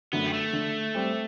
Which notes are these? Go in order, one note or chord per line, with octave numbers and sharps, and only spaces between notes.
F#2 D3 A3 B3
G3
A3
D3
G3 C4 G4